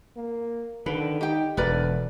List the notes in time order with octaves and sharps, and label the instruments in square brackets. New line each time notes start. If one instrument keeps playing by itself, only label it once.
[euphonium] A#3
[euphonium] D3 [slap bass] D#3 [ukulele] B4
[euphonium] D#4 [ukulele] G4 G5
[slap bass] E1 [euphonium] D2 [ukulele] A#4 B4 D5